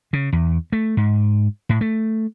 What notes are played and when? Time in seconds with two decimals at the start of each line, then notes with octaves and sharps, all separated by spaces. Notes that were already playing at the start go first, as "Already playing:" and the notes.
0.13 C#3
0.33 E2
0.72 A3
0.97 G#2
1.69 A2
1.81 A3